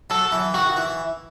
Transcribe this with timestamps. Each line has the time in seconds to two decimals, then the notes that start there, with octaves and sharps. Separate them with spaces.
0.10 F#3 A4
0.32 E3
0.54 D#3 F#4
0.76 E3